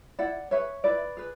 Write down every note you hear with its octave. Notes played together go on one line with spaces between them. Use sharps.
E4 D5 F#5
G#4 B4 C#5 E5
E4 B4 D5
G#4 B4